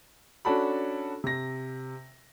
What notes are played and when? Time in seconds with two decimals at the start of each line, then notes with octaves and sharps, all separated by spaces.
0.45 C#4 D4 F#4 A4 A5 B5
1.24 C3 A#6